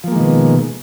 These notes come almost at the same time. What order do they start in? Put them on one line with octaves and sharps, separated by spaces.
F3 A#3 G#3 D#3 B2